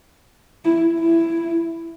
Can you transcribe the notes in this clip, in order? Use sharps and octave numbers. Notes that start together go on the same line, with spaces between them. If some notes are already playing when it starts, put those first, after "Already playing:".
E4
E4